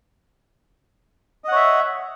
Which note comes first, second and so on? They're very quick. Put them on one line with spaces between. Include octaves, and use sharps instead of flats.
D#5 F#5 C#5 E5